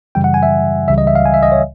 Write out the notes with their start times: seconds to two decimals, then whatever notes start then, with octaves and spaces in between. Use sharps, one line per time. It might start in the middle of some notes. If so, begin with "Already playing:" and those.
0.15 F#2 C#3 E3 G3 G5
0.24 F#5
0.34 G#5
0.43 E5
0.88 C#2 C#3 E3 G3 E5
0.98 D#5
1.07 E5
1.15 F5
1.26 G#5
1.34 E5
1.43 D#5
1.52 C#5